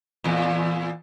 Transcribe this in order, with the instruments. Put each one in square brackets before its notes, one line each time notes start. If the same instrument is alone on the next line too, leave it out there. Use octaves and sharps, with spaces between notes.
[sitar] E2 A#2